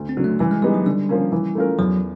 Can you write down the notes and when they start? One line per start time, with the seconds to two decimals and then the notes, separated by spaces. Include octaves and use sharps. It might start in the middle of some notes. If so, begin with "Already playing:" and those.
Already playing: D2
0.09 C4
0.17 D3 F#3
0.24 A3
0.39 E3 G3
0.51 G#3
0.62 G3 G#3 B3 D#4 G4
0.74 F#3
0.86 D3 G3
1.09 F3 A#3 C#4
1.32 E3
1.55 A3 C#4 F4 A#4
1.78 E2 F#3